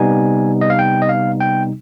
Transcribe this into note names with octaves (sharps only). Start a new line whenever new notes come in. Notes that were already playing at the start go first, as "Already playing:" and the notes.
Already playing: C3 G3 B3 D#4 G#5
D#5
F5
G5
D#5
F5
G5